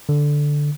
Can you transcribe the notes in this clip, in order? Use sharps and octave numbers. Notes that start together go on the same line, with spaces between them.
D3